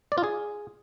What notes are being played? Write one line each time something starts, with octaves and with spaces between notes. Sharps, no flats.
D5
F4
G#4